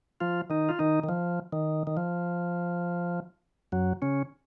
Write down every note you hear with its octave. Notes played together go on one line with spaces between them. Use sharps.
F3 F4
D#3 D#4
F4
D#3 D#4
D#3
F3
D#3
D#3
F3
F#2 F#3
C#3 C#4